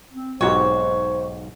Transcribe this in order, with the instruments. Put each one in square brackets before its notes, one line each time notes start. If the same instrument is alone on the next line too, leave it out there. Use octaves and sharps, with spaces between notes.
[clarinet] C4
[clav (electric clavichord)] B1 G#2 [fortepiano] C4 F#4 G4 [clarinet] C5 [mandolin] C#5